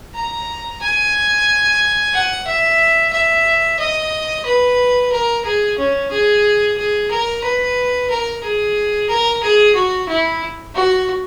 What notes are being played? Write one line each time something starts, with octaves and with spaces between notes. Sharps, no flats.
A#5
G#5
F#5
E5
E5
D#5
B4
A#4
G#4
C#4
G#4
G#4
A#4
B4
A#4
G#4
A#4
G#4
F#4
E4
F#4